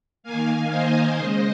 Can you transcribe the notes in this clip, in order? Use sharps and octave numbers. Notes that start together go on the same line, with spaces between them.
D#3 A#3 F5 G#5
C5 D#5
C#3 G#3